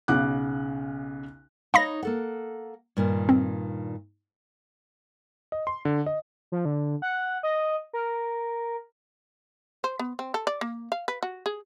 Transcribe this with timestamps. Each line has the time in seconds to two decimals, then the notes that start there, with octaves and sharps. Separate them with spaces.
0.08 B1 C#3 F#5 D6 F#6
1.74 D#4 C#5 F5 B5 A#6
2.03 A#3 A4 F#5
2.97 G2 A#2 D#3
3.29 C4
5.52 D#5
5.67 C6
5.85 D3
6.06 D#5
6.52 F3
6.65 D3
7.02 F#5
7.43 D#5
7.93 A#4
9.84 C5
9.99 B3
10.19 C4
10.34 A4
10.47 D5
10.61 A#3
10.92 F5
11.08 B4
11.23 F#4
11.46 G#4